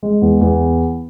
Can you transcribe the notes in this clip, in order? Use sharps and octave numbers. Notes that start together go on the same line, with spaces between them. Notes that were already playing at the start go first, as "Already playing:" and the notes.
G#3
E2
E2